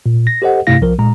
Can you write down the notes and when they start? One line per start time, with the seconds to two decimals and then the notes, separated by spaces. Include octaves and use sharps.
0.06 A#2
0.27 A#6
0.42 G4 A4 C5 D#5 F#5
0.67 G2 C3 A3 E4 F5 A#6
0.81 B1 F3 A#4
0.98 A#2 G#3 A#5